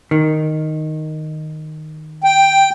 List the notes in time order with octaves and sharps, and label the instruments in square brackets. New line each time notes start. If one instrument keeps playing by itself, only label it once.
[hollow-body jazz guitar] D#3
[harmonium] G5